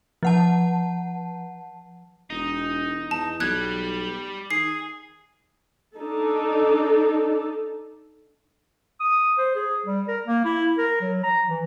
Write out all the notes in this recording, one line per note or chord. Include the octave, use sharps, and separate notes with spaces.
F3 F#5 A5
E1 D#4
E2 A5
B1 G3 F#6 G#6
D#3 G#4 C7
D4 D#4 A4
D#6
C5
G#4
G3
A#4
A#3
E4
A#4
F#3
A#5
E3